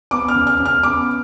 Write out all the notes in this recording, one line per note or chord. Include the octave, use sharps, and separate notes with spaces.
B3 D6
F6
C#3
F6
C#3
F6
B3 D6